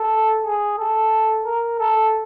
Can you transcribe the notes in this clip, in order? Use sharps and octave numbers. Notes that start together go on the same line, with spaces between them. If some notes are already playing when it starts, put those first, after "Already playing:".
Already playing: A4
G#4
A4
A#4
A4